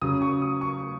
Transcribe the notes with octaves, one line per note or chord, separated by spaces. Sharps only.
C#3 F#3 C#4 D#6
C#6
D#6
C#6